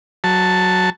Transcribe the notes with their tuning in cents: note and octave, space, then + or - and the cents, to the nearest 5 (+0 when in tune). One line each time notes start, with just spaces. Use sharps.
F#3 +0 A5 +0